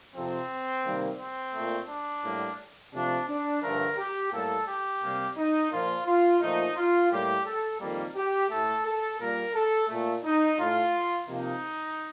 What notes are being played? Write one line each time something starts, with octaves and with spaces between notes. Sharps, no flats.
F2 C3 F3 C4
C3 D#3 G3 A#3
C4
A#2 A3
D4
A2 G3 A#3
C3 F3 A3 D4
D4
G2 D3 F3 A3 A#4
G4
A2 G3 A#3 A4
G4
C3 G3 A#3
D#4
A#2 F3 A#3 F4
F4
A#2 F3 A3 D#4
F4
A2 G3 A#3 G4
A4
F2 D#3 G3 A#3
G4
A2 A3 A4
A4
A#2 G3 A#3 A#4
A4
A#2 A3
D#4
A2 A3 F4
C3 F3 A#3 D#4